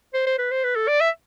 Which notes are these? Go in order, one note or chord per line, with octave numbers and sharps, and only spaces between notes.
C5
C5
B4
C5
B4
A4
D5
E5